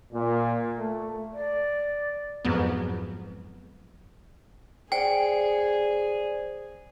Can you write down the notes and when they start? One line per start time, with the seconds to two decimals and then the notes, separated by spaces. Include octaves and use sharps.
0.13 A#2
0.78 A3
1.33 D5
2.45 F2 G#2 F#3 B3
4.92 G#4 C5 D5 G5